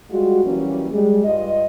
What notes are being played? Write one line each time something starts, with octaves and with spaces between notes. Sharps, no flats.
G3 G#3 F4 F#4
E3 F#3 G3 A#3 C#4
G3 G#3
G2 D4 F4 D#5